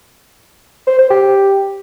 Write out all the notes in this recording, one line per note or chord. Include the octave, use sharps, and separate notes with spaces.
C5
C5
G4